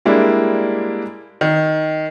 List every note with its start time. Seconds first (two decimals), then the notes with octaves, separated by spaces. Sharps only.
0.05 G3 G#3 A#3 D4 E4
1.41 D#3